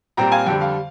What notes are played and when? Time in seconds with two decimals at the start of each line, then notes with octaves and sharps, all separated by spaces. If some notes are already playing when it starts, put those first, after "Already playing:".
0.17 A#2 G3 C4 G5 A#5
0.32 F5 G#5
0.46 F2 D3 G3 G5
0.61 F5